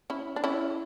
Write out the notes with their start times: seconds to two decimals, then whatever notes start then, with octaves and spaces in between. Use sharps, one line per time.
0.10 C#4 E4
0.36 D4
0.44 C#4 E4